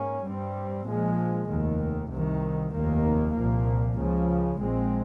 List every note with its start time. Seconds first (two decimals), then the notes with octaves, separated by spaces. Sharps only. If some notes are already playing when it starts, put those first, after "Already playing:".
Already playing: G#2 A#3 C#4
0.25 G2 G3 C4
0.87 A#1 A#2 F3 G#3
1.49 F1 D#2 D#3
2.11 C2 C3 D#3
2.74 F1 D#2 D#3 A#3
3.35 C2 A#2 F3 A#3
3.98 C#2 C#3 F3
4.60 A#1 A#2 G#3 C4